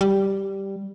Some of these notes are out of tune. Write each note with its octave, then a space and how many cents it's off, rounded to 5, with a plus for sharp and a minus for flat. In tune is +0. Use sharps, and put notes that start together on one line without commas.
G3 -5